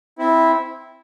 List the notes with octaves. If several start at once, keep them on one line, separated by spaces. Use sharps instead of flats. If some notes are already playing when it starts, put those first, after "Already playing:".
C4 E4